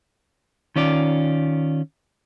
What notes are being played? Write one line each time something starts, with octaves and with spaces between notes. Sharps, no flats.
D#3 C#4 F4 D5